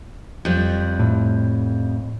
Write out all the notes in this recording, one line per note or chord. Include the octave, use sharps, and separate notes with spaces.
F2 G3
A2